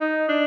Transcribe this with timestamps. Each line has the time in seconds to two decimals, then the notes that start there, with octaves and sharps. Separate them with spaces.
0.01 D#4
0.29 D4